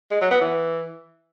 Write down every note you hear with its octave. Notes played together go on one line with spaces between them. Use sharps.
G#3
F#3
B3
E3